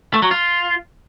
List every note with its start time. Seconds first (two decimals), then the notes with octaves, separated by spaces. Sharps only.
0.14 A3
0.22 F#3
0.31 F4